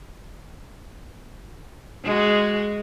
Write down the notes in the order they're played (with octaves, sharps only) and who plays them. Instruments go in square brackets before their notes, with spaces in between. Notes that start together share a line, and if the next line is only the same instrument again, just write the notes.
[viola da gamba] G#3 F#4